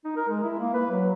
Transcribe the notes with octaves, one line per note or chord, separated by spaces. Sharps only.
D#4
A#4
G#3
E4
A#3
B4
F#3